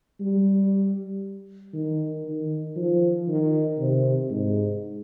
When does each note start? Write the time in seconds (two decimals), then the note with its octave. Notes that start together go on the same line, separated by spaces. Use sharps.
0.20 G3
1.74 D#3
2.25 D#3
2.76 F3
3.28 D#3
3.79 C3
4.30 G#2